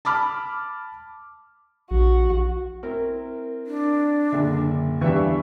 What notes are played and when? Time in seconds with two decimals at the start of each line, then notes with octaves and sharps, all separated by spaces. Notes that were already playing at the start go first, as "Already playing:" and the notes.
0.05 A5 B5 D6 F6
1.91 A#1 F#4
2.83 C4 E4 A#4
3.67 D4
4.32 F#1 A#2 D3 E5
5.01 E2 E3 G3 D4 E5 F5 C#6